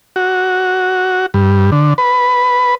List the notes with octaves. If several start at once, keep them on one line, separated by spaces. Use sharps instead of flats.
F#4
G2
D3
B4